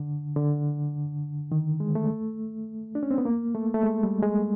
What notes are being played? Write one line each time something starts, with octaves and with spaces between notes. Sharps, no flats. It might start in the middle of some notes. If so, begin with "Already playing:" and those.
Already playing: D3
D3
D#3
G#3
A3
D4
C#4
C4
B3
A#3
A3
A3
G#3
G3
G#3